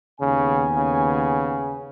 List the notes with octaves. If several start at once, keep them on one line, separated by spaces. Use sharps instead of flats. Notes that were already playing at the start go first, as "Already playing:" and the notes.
D#2 C#3 B3 G#5
C#3